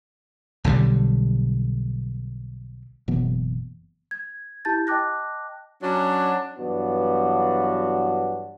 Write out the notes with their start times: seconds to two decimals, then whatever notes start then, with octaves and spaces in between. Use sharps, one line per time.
0.64 B1 D3 F#3 G3
3.08 F#1 B2 E3 B3
4.11 G#6
4.65 E4 G4 A5 G6 A6
4.87 D#5 G5 A5 D6 F#6 A#6
5.82 F#3 C#4 D4
6.58 G2 E3 F#3 B3 D4 F#4